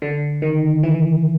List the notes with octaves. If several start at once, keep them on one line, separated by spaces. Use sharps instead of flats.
D3
D#3
E3